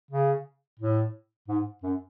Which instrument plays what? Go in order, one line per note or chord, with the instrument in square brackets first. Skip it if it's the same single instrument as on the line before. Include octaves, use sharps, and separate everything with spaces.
[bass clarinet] C#3
A2
G#2
F#2